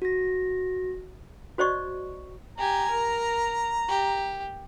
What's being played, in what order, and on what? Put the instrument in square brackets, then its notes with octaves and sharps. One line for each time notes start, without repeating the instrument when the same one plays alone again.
[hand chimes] F#4 A#6
[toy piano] F#4 C5 D5 D#5 C#6
[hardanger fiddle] G4 G#5 [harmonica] A#5
[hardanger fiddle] A#4
G4